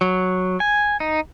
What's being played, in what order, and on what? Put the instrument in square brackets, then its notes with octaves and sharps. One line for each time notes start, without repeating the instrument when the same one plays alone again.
[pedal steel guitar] F#3
G#5
D#4